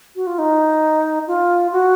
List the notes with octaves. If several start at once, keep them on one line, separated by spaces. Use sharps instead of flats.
F#4
F4
D#4
F4
F#4